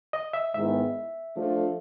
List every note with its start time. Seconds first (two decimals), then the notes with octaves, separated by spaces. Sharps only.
0.13 D#5
0.33 E5
0.54 G#2 D#3 G#3 B3 E4 E5
1.36 F3 A3 D4 F4 A4